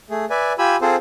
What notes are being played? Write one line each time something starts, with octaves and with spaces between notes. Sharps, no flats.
A3 G#4
B4 D5 E5 G#5
F4 G4 G#5 B5 E6
C4 F4 G#4 A4 C5